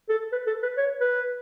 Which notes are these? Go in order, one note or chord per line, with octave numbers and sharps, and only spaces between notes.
A4
B4
A4
B4
C#5
B4